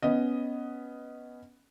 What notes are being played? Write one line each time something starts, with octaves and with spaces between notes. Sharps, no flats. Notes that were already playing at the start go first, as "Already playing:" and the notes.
B3 C#4 D#5